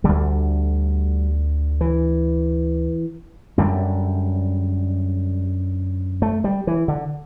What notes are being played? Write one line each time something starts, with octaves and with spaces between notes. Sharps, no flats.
D2 D3 G3
E3
F#2 D3 G3
A3
G3
E3
D3